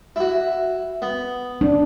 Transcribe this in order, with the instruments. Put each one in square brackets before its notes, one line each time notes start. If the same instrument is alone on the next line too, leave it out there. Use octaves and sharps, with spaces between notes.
[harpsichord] E4 F#4
B3
[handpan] D4